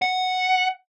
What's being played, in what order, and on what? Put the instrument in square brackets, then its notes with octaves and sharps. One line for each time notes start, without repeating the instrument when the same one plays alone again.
[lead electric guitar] F#5